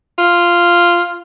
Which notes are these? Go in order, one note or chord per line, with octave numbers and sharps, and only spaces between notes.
F4